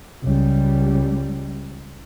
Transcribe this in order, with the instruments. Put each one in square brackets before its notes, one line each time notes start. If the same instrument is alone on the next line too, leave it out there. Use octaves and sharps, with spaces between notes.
[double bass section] C#2 G3